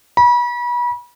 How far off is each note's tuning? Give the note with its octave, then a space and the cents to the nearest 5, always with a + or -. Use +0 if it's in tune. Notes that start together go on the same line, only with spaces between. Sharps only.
B5 -35